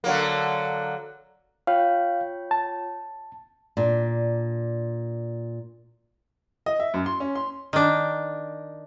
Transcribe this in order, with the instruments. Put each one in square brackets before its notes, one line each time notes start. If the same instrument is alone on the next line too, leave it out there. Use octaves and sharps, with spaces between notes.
[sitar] D3 F#3 A#3
[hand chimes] F4 C#5 G5 [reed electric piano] F5
[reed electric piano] A5
[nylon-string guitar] A#2 D4
[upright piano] D#5
E5
F#2
C6
C#4
C6
[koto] D#3 D4